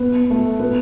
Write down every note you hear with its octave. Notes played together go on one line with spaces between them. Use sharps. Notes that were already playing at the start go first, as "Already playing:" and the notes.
Already playing: B3
A3
B3